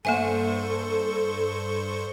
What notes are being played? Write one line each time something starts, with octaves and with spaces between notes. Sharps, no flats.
G2 A#3 A4 C5 E5 G#5 C#6